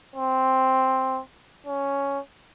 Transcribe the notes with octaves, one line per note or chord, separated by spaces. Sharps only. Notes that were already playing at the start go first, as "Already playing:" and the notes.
C4
C#4